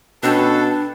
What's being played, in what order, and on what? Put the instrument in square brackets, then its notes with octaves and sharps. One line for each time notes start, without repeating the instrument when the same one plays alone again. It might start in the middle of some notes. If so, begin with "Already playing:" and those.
[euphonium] B2 [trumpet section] C#4 A4 [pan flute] D4 [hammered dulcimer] B4 G5